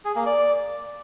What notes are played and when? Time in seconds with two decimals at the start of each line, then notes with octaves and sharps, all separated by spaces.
0.05 G#4
0.15 A#3
0.26 D5